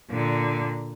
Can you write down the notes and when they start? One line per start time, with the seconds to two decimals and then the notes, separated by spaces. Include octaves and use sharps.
0.10 A#2 D3